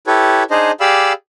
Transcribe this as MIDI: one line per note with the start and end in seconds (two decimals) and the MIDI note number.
0.07 0.43 64
0.07 0.43 67
0.07 0.43 69
0.07 0.43 71
0.07 0.43 73
0.51 0.71 62
0.51 0.71 63
0.51 0.71 68
0.51 0.71 72
0.51 0.71 75
0.80 1.13 67
0.80 1.13 68
0.80 1.13 74
0.80 1.13 77
0.80 1.13 83
0.80 1.13 88